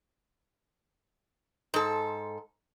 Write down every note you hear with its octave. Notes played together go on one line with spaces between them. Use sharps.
G#2 A4